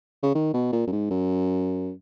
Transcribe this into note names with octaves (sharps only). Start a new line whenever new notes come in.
C#3
D#3
B2
A#2
F#2
G#2
F#2